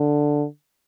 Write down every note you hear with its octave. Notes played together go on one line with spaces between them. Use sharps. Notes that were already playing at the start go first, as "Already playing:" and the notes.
Already playing: D3